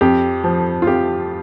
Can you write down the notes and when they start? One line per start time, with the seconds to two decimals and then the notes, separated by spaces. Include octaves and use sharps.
0.01 F2 G4
0.44 F3
0.82 F4
0.87 F2 G4